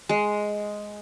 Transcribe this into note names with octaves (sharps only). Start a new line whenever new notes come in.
G#3